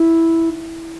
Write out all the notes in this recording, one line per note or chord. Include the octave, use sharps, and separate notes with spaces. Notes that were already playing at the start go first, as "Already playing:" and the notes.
Already playing: E4